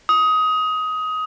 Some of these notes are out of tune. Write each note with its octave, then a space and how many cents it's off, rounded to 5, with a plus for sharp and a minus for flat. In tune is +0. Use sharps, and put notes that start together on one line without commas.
D#6 +20